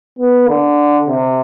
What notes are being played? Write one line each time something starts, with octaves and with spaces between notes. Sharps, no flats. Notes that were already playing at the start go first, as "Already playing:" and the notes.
B3
D3
C3